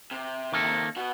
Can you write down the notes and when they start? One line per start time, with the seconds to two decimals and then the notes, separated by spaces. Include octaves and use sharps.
0.11 C3
0.52 D#3 A#3 A4
0.96 B2 F#4